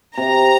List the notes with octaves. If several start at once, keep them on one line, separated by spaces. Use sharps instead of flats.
C3 A#5